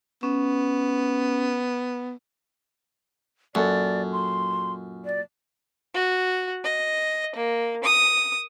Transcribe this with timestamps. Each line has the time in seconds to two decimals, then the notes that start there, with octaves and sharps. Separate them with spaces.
0.23 B3 C#4
3.55 F#2 A#2 F#3 A4 D5
4.12 C6
5.05 D5
5.94 F#4
6.64 D#5
7.36 A#3
7.84 D#6